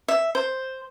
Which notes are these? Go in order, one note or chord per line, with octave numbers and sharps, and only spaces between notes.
E5
C5